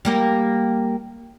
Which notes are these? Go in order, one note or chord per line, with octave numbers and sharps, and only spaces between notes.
G3 A#3 G4